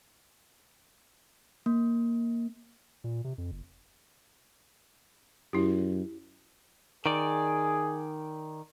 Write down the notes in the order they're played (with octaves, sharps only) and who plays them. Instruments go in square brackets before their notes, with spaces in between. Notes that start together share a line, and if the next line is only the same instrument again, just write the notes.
[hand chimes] A#3
[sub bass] A#2
C3
F2
F#1
[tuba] F#2 [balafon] E4 G4
[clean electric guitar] D#3 D5 [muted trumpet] G#4